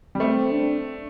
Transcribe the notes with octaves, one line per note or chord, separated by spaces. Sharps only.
G3
A3 C4
D4